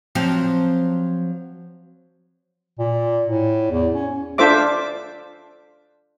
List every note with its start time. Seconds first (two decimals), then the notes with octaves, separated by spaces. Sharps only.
0.15 F3 F#3 C4
2.79 A#2
3.25 A2
3.71 E2
3.94 C#4
4.38 D4 F4 A4 C5 E5 D6